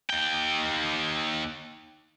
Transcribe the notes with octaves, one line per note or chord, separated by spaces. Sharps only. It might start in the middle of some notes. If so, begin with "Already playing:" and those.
D#2 G5